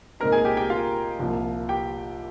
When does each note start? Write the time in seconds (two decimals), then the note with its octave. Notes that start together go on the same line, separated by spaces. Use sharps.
0.20 C2 A#2 G#3 C4 D#4 A#4 A#5
0.32 G#4 G#5
0.45 G4 G5
0.57 G4 G5
0.70 F4 F5
1.19 C2 A#2 F3
1.69 G4 G5